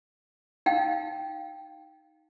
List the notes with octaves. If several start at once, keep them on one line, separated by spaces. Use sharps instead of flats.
D#4 F5 G5